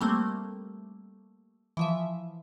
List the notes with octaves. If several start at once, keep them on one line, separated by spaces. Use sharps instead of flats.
G3 A3 A#3 C4
E3 F3 E5